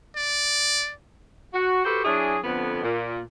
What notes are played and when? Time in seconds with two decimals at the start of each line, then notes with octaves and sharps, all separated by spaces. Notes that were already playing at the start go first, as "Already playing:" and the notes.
0.16 D5
1.54 F#4
1.85 F#4 G4 A4 B4 C5
2.05 F#3 D4 E4 G#4
2.44 F2 D3 B3
2.83 A#2